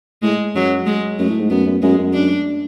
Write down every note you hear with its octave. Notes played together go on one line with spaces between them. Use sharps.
A2 G#3
F#2 F#3
G#3
F#2 A3
A2
G#2
F#2 B3
F#2
F#2 G#3
F#2
D4